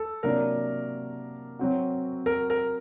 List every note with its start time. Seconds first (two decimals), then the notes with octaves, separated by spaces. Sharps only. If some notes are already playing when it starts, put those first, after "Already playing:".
Already playing: A4
0.23 C3 F#3 A#3 D4 A#4
1.59 F#3 C4 F#4
2.26 A#4
2.50 A#4